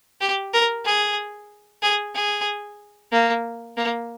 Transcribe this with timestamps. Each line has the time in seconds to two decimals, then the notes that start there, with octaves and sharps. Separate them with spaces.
0.21 G4
0.53 A#4
0.85 G#4
1.82 G#4
2.15 G#4
3.12 A#3
3.77 A#3